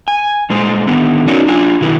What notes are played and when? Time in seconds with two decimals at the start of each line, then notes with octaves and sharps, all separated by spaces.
0.08 G#5
0.50 A#2 G#3 C5
0.87 D3 D#3 B3
1.27 C#4 D#4 F#4 A#4 C#5 D5
1.47 D4 F4 G#5
1.81 B2 D#3 E4 B4